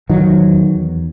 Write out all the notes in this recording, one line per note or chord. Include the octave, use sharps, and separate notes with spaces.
E2 D#3 F#3
E2